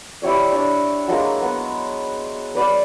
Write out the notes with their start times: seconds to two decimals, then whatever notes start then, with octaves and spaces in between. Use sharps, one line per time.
0.22 E4 G4 C#5 D5
0.52 D4 C#5
1.08 F#3 G#3 A#3 A#4
1.42 B3
2.55 B4 D5 F#5